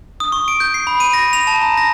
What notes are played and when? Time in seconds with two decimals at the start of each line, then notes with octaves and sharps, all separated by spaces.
0.20 D#6
0.32 C#6
0.48 D7
0.60 G6
0.74 C7
0.87 B5
1.00 D#7
1.13 A#6
1.33 F7
1.47 A5
1.61 A#5
1.77 A#6